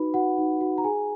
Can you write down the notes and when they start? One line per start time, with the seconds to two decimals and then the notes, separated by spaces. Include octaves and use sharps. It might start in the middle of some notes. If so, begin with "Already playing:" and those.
Already playing: D#4 F#4 B4 B5
0.14 F#4 F#5
0.38 D#4
0.61 F#4
0.78 A#5
0.84 G#4 G#5